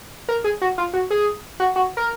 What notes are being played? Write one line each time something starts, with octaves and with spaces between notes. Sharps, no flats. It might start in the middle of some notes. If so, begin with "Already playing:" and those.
A#4
G#4
F#4
F4
F#4
G#4
F#4
F#4
A#4